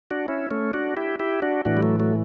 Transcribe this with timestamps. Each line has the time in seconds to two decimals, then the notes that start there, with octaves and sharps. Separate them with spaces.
0.11 D4 F#4
0.28 C#4 E4
0.51 A3 C#4
0.73 D4 F#4
0.97 E4 G4
1.20 E4 G4
1.42 D4 F#4
1.65 A2 E3 D4 F#4
1.77 G3
1.83 F#3 A3
2.00 F#3 A3